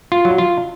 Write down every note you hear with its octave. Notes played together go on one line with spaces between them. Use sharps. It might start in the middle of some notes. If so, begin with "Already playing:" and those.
F4
F#3
F4